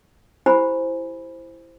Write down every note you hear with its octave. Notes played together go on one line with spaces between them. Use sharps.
E4 G4 C5 G#5 B5